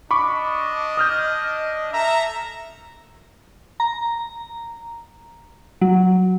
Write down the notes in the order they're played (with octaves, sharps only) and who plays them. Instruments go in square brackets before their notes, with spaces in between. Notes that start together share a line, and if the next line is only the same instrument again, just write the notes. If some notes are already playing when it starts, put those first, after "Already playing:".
[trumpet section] D4 D#5 [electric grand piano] B5 C#6 D6
[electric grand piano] D#6 F6 G6
[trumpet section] A4 E5 A#5
[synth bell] A#5
F#3